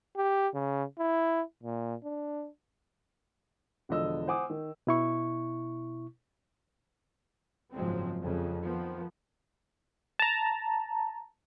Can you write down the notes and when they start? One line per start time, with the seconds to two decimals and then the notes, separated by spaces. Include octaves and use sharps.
0.16 G4
0.54 C#3
0.99 E4
1.63 A#2
2.04 D4
3.89 E1 D3 F3 D#5 E6
4.28 C5 F#5 G#5 D6 D#6
4.50 D#3
4.87 B2 E4 C#6
7.73 F#1 G#2 F3 F#3 G#3 C4
8.19 F2 C#3
8.62 D#3 F3 B3
10.19 A5 A#5